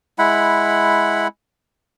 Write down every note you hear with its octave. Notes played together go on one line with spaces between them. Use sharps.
G#3 E4 F#5 B5